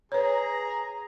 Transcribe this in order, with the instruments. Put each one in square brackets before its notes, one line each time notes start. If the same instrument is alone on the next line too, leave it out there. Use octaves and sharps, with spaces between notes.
[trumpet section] G#4 A#5 [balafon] B4 C#5